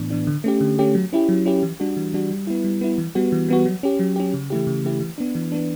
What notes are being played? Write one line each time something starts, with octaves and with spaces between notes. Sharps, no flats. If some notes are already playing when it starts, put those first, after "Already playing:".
Already playing: A2 E3 B3 D4
E3 B3 D4
D3
A3 C#4 G4
D3
A3 C#4 G4
F#3
C#4 E4 G4
F#3
C#4 E4 G4
E3
G3 D4 F#4
E3
G3 D4 F#4
G3
B3 E4
G3
B3 E4
E3
G3 B3 F#4
E3
G3 B3 F#4
F#3
C#4 G4
F#3
C#4 G4
C#3
E3 A3 E4 G4
C#3
E3 A3 E4 G4
E3
B3 D4
E3
B3 D4